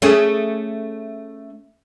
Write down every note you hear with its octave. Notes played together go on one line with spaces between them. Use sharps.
A3 C#4 G#4